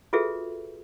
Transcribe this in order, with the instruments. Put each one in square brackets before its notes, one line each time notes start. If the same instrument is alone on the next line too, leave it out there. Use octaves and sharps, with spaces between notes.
[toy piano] F4 F#4 G#4 A4 B4 E5